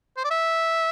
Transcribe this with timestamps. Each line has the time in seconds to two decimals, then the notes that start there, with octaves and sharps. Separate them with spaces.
0.17 C5
0.24 D5
0.31 E5